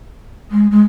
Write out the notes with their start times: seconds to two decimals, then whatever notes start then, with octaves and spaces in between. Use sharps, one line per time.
0.51 G#3
0.71 G#3